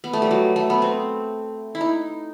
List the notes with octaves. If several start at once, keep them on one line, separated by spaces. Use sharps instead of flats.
B3
A3
G3
F#3
A3
B3
C4
E4
D#4